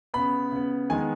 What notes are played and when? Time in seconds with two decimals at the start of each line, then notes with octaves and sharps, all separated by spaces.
0.14 C#3 B3 B5
0.52 C#3 B3
0.90 D#3 G#3 B3 G#5